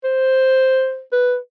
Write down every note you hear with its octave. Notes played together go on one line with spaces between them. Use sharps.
C5
B4